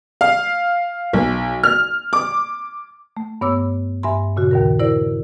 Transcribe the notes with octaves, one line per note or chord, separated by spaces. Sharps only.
F5
B1
F6
D6
A3
G2 B3 C#5 D6 E6
G2 E5 G#5 B5 C6
A#2 C#3 F#4
D#2 D#3 A#4
E4 A#4 C5 D5